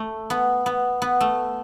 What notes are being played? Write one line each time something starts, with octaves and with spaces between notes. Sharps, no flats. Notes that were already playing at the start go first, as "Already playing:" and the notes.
Already playing: A3
B3
B3
B3
A3